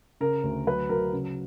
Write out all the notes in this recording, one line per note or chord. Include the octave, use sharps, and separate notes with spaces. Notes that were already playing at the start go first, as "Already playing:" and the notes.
C#3 A#4
D2
F#3 B4
F#3 A#4
C#3